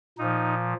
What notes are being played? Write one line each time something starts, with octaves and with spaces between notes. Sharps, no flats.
A#2 F3 D#4